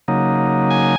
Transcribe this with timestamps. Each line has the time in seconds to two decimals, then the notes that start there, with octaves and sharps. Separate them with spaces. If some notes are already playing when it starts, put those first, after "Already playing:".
0.08 C#3 F#3 A#3 D#4
0.71 G#5